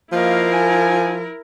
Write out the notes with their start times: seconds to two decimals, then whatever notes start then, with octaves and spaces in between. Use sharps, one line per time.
0.12 F3 A#3 E4 A#4 D#5 F5
0.52 G#5